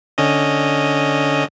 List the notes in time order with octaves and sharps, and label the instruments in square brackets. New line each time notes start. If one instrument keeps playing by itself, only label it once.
[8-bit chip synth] D3 C#4 D#5